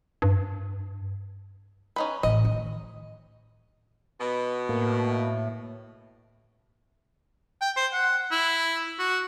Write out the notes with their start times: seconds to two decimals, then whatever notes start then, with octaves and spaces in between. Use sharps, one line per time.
0.22 G2
1.96 C#4 D#4 B4
2.23 A1 D#5
2.45 D#3
4.20 B2 B3
4.69 A2 A#3
7.61 G5
7.76 C5
7.93 F#5
8.31 E4
8.99 F#4